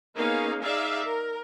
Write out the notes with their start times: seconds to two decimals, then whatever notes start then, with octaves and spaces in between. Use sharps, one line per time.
0.15 A#3 B3 C#4 D#4 G#4 F5
0.63 D#4 G#4 D5 E5 F5
1.05 A#4